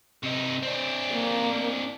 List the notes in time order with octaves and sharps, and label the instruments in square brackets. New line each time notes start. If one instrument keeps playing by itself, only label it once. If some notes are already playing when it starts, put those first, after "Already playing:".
[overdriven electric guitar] C3 D#4
C4 D4
[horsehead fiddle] A#3